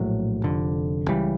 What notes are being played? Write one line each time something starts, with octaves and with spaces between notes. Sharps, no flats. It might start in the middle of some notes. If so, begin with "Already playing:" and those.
Already playing: A#1 A2 F#3
F1 F2 D3
C#2 C#3 E3 G3